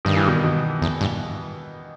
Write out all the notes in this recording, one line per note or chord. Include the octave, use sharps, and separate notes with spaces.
G2 D#3
E3
B2 D#3
B2
E2
G2